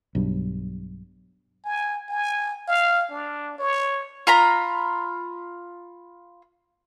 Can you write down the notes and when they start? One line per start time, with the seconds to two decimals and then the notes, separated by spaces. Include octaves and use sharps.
0.15 B1 G2
1.64 G#5
2.10 G#5
2.68 F5
3.11 D4
3.58 C#5
4.27 F4 A#5 B5